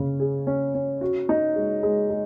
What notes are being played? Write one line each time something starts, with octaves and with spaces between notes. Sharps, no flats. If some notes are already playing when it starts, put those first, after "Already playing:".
Already playing: C#3 C#4
G#4
C#4
C#4
F#4
D#4
G#3
G#3
G#3